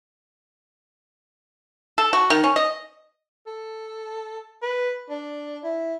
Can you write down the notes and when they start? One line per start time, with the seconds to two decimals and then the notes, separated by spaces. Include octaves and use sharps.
1.98 A4
2.13 F#4
2.30 D#3
2.44 C#4
2.56 D#5
3.47 A4
4.62 B4
5.10 D4
5.64 E4